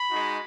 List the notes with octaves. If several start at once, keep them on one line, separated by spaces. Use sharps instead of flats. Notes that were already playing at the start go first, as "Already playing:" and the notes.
Already playing: B5
G#3 D#4 F#4